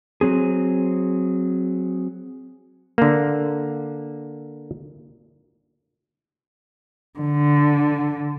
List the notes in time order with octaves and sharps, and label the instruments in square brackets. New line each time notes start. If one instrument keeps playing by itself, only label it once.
[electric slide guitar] F#3 C4 G#4
[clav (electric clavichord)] D3 A#3
[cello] D3